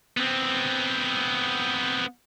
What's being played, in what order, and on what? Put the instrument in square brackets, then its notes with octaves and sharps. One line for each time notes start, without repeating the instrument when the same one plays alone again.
[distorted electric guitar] B3 C4